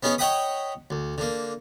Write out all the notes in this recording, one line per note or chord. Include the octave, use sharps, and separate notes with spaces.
B3 C#4 D#4 G#4
C#5 D#5 F#5 G5 B5 D#6
D2
D3 A#3